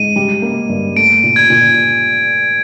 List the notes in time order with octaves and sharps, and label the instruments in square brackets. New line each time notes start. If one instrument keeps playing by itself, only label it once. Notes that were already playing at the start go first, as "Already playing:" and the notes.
Already playing: [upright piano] G#2 [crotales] D#7
[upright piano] G3
A#3
G2
[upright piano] A3 [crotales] D7
[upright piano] A#2
[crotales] G#6
[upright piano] A#2